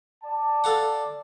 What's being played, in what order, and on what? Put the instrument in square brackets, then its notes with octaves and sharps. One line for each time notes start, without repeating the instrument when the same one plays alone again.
[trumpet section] D5 A5
[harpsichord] A4 F5 F#5